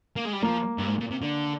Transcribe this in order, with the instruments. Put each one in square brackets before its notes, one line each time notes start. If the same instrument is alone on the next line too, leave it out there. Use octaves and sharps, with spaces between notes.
[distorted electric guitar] A#3
G#3
G3
[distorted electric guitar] F3 [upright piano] A#3
[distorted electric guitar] G2
G#2
A#2
C3
D3